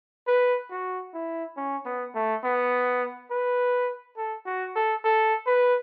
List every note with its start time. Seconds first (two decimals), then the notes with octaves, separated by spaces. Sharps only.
0.27 B4
0.71 F#4
1.14 E4
1.57 C#4
1.85 B3
2.15 A3
2.44 B3
3.31 B4
4.17 A4
4.46 F#4
4.75 A4
5.04 A4
5.47 B4